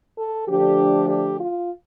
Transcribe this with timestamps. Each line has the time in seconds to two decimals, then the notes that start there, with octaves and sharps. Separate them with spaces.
0.16 A4
0.47 D3 F3 A3 D4 G4
1.08 G4
1.39 F4